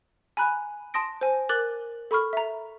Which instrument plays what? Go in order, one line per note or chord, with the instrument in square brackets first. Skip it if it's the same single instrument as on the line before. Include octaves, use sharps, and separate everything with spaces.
[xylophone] G#5 A#5 B5 F#6
A5 C6 D#6 A#6 D7
C5 G#5
A#4 D6 F#6 A6 F#7
A4 B5 C#6 F6
E5 A#5